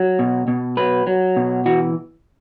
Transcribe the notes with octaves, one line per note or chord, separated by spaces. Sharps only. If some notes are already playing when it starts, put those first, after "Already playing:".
Already playing: F#3
B2
B2
F#3 B4
F#3
B2
E3 F#4